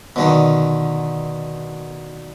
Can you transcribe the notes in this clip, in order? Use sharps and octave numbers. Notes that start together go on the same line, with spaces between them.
B2 D3 D#3